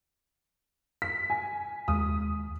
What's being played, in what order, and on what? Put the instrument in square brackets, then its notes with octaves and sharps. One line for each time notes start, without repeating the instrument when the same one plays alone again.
[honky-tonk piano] B6
G#5
[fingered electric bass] D#2 G#3 [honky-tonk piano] D#6